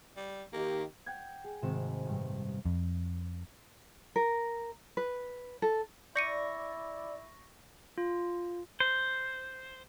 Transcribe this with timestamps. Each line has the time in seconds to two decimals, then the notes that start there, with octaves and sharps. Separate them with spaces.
0.17 G3
0.53 D#3 A#3 G4
1.06 F#5 G5 G6 G#6
1.44 G#4
1.62 G#1 C3 D#3 E7
2.05 A1 G2
2.65 F2
4.16 A#4
4.97 B4
5.62 A4
6.16 E4 D5 C#6 G6 A#6 C#7 D#7
7.98 F4
8.80 C5